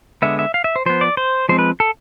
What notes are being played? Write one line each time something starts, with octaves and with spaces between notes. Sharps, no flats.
D3 G#3 B3 E5
E5
F5
E5
C5
F3 B3 C5
D5
C5
F3 G#3 C4 C5
B4
A4